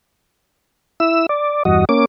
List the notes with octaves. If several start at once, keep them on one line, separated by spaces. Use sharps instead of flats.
E4 E6
D5
E2 G2 F#4 D#5
A#3 C#4 D6